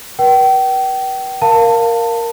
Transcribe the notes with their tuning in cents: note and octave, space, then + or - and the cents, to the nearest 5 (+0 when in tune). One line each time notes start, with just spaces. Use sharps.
B4 -40 G5 -35
A#4 +0 F5 +0 A5 +25